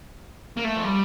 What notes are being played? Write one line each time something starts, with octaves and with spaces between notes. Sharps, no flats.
A#3
A3
F3
G3